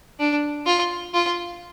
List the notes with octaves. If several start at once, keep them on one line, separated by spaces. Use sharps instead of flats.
D4
F4
F4